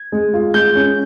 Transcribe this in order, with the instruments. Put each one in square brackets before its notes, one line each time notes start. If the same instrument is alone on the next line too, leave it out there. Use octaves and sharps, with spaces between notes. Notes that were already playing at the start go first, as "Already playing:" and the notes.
Already playing: [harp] G#6
[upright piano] G#3
F4
[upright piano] G#3 [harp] G6
[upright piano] C#4